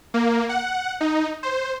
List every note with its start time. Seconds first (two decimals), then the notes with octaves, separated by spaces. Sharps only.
0.14 A#3
0.49 F#5
1.01 D#4
1.43 C5